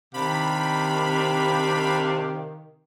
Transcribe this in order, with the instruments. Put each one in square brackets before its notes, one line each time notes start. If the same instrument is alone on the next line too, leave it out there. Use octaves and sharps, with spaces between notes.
[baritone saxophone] C3 [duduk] D#3 [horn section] D4 G4 F5 [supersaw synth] B5